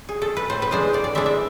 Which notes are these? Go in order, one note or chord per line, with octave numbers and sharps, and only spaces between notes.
G#4
A4
B4
A2 C5
B4
E3 G#3 D4 C5
A2 D5
D5
E3 G#3 D4 E5
E5